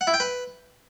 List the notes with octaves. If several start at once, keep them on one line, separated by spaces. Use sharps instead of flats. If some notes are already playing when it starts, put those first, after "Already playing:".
F#5
E4
G5
B4